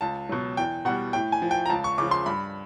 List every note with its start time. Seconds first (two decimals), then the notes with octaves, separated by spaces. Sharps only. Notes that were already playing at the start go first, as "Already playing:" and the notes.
0.01 C#2 A5
0.29 B2 F#3
0.57 E2 G5
0.85 B2 G3 F#5
1.13 A2 G5
1.32 G#5
1.42 F3
1.51 G5
1.66 A#5
1.70 C#2 A5
1.84 C#6
1.98 C#3 F3 D6
2.11 C6
2.26 G2 B5